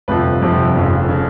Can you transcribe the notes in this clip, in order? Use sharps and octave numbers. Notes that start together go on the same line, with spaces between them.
G1 F2 C3 F3 B4
G1 F2 C3 F3
F1 F2 C#3
C#3